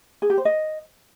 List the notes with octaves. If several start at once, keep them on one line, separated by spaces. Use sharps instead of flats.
G#4
G4
C5
D#5